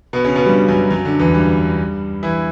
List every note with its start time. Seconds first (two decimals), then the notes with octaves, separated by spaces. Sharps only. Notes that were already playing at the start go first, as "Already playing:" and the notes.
0.13 B2 B3
0.24 C#3 C#4
0.36 B2 B3
0.46 G2 G3
0.68 F#2 F#3
0.90 F#2 F#3
1.05 D3
1.20 E2 E3
1.35 G2 G3
2.23 E3 E4